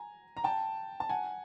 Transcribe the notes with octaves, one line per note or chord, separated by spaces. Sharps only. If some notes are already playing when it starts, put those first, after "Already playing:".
Already playing: G#5 A#5
A#5
G5 A5
A5
F#5 G#5